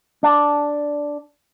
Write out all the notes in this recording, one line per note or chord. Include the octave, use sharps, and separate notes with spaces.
D4